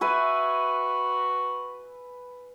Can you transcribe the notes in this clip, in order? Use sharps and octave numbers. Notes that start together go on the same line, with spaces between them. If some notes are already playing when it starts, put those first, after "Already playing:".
F#4 B4 E5 G#5